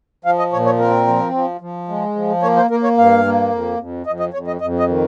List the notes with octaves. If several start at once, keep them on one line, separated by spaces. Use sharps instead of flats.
F3 F5
D#5
A#2 C#5
C#5
C4 A#4
F3
F3
F3
G#3
F3
A#3 C#5
C5
A#3 A#4
C#5
G2 F5
A#3
F2
F2
F2 D#5
D#5
F2 C#5
D#5
F2 D#5
D#5
D#3